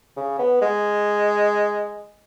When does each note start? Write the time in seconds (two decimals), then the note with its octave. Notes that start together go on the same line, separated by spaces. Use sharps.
0.17 C#3
0.39 B3
0.62 G#3